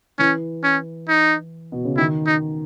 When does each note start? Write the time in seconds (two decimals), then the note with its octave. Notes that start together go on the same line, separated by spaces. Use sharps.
0.19 E3 C#4
0.63 C#4
1.09 D#4
1.72 B2
1.85 C#3
1.97 D#3 E4
2.27 D#4